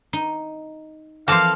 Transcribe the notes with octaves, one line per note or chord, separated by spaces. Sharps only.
D#4
E3 F3 C4 A4 C5 F5 D6